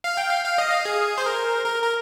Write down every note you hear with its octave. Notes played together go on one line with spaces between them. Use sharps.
F5
G5
F5
F5
D#5
F5
G#4
C5
A#4
A#4
A#4